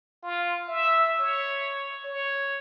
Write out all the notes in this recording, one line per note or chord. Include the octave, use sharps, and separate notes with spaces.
F4
E5
C#5
C#5